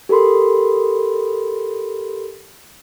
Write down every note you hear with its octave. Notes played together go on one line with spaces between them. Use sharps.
G4 A4 A#4 B5 C6